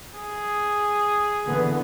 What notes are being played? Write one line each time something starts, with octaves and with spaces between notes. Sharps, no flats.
G#4
D3 E3 B3